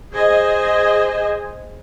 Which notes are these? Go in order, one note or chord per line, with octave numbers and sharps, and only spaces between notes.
G#4 C5 D#5 G#5